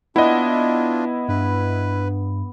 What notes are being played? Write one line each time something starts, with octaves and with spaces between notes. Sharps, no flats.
B3 D4 E4 F4 D#5
G2 B4